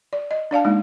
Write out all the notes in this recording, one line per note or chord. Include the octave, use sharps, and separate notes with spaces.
D5
D#5
D4 D5 F5 A5
G#3 A#3 D#4